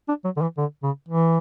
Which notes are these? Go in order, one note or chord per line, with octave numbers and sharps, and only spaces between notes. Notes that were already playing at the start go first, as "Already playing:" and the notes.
D4
F#3
D3
E3
D3
C#3
E3